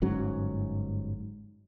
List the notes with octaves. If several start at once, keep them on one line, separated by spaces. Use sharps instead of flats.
G1 G#2 F#3 C#4